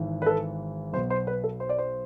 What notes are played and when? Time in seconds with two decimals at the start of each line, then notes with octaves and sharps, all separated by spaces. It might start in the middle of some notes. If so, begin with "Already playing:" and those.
Already playing: G#1 G#2 E3
0.22 B4
0.26 A4
0.93 B1 B2 C5
1.10 C5
1.27 B4
1.44 A4
1.60 C5
1.69 D5
1.78 C5